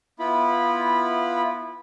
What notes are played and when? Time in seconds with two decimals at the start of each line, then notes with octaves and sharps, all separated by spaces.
0.19 B3 E4 F4 B5